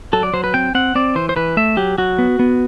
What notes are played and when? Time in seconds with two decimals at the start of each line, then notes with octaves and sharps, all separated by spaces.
0.13 F#3 A4
0.23 D5
0.33 F#3 C5
0.44 B4
0.54 C4 G5
0.75 C4 F#5
0.95 C4 D5
1.15 E3 C5
1.29 C5
1.36 E3 B4
1.57 A3 E5
1.77 F#3 G4
1.98 F#3 F#4
2.18 B3
2.39 B3